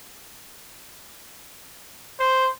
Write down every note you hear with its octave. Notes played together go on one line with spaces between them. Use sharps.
C5